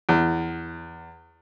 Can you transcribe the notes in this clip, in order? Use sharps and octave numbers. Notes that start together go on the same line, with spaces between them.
E2